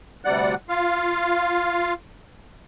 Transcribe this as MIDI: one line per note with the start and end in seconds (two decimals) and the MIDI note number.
0.25 0.55 38
0.25 0.55 48
0.25 0.55 55
0.25 0.55 74
0.25 0.55 78
0.25 0.55 90
0.69 1.94 65
0.69 1.94 77